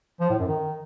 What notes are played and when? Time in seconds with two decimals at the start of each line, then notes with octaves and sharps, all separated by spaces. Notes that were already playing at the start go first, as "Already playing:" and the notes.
0.20 F3
0.30 A2
0.39 F#2
0.48 D#3